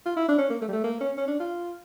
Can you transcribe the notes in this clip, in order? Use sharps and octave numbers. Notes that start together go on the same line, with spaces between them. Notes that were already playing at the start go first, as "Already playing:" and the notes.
F4
E4
D4
C#4
A#3
A3
G3
A3
A#3
C#4
C#4
D4
F4